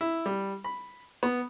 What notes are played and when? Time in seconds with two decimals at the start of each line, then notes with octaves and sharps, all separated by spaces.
0.01 E4
0.26 G3
0.64 B5
1.23 B3